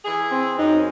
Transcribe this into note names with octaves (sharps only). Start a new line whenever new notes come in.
E3 E4 G#4
C4
F#2 D#4